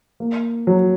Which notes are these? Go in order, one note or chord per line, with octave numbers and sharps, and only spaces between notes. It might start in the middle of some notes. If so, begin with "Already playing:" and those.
A#3
F#3